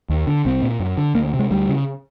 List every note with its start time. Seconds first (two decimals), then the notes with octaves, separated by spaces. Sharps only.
0.09 D#2
0.27 D3
0.45 C2 C4
0.62 A#2
0.80 F#2
0.97 D3
1.15 D2 A#3
1.34 C3
1.39 G#3
1.51 D2 G3
1.69 C#3